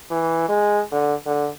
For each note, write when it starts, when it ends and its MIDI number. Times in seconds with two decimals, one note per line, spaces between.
0.11 0.46 52
0.49 0.82 56
0.92 1.14 50
1.26 1.48 50